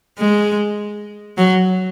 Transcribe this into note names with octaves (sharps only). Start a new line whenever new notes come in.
G#3
F#3